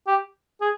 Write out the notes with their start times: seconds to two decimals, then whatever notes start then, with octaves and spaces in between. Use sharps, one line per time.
0.07 G4
0.61 G#4